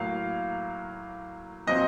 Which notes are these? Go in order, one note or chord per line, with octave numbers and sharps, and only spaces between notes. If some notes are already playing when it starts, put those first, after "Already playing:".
Already playing: A2 F#3 A#3 F5
A#2 F#3 C4 D#5